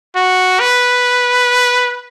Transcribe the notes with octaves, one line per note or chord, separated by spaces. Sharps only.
F#4
B4